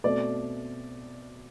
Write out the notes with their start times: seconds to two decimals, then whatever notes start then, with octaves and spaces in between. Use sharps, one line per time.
0.04 B2 A3 C4 D5